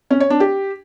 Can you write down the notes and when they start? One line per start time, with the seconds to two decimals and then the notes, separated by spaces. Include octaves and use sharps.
0.11 C#4
0.20 C#5
0.30 D4
0.40 G4